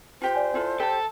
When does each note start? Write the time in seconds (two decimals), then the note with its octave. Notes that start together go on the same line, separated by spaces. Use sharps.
0.22 F4 G4 C5 G5
0.34 D5 G#5
0.54 E4 F4 A4
0.80 G4 A4 A5